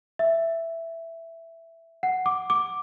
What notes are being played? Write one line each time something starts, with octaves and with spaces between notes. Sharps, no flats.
E5
F#5
D6
D6